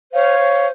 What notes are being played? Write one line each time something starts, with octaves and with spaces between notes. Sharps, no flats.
C5 C#5 F5
C5